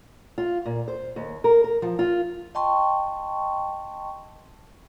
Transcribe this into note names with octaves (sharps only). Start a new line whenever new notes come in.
F4
A#2
C5
D#2
A#4
A#4
F3
F4
D#5 G5 A5 C6 C#6